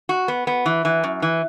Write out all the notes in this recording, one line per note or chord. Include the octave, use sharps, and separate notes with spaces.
F#4
B3
B3
E3
E3
F#2
E3